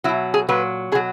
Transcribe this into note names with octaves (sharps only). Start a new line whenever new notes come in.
B2 F#3 E4
G#4
A#2 F#3 B4
B2 F#3 G#4